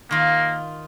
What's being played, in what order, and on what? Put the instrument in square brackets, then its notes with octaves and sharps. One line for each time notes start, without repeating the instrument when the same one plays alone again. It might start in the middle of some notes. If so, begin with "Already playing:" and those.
[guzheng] D#3 F4 [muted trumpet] A#3